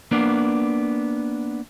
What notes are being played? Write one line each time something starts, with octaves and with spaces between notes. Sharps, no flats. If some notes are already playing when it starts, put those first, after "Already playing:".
A#3 B3 D4